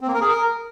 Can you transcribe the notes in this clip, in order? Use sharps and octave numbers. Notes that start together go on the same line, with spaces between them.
C4
A#3
A#4
G#4
A#4